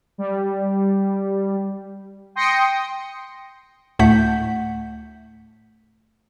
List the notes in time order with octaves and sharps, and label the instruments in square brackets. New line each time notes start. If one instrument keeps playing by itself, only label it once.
[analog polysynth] G3
G5 C6 D#6 A#6 C#7
[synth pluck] D2 A2 A3 F#5 G6 B6